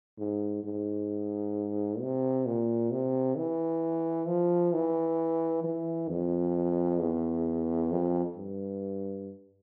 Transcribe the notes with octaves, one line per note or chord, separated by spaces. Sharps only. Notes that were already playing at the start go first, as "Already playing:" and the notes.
G#2
G#2
C3
A#2
C3
E3
F3
E3
E3
F2
E2
F2
G2